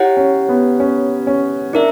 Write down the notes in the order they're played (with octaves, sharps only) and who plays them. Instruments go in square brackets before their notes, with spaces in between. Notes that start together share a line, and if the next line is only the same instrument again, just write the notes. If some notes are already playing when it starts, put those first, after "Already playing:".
Already playing: [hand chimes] E4 G4 C#5 F#5
[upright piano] C#4
B3
C#4
C#4
[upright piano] D4 [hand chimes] E4 A#4 E5